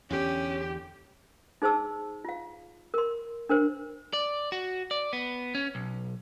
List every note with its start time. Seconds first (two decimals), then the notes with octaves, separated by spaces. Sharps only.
0.10 E2 D3 C#4 G4
1.62 D#4 G#4 C5 A5 E6
2.25 F4 F5
2.94 A#4 C6
3.49 D4 A#4 C5
4.13 D5
4.52 F#4
4.91 D5
5.13 B3
5.55 C#4
5.75 B1